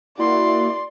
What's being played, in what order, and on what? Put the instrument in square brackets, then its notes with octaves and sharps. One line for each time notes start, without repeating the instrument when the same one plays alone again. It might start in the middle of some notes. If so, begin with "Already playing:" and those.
[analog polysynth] A#3 E4 F#4 [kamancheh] D5 C6